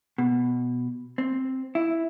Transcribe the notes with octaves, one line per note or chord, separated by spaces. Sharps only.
B2
C4
E4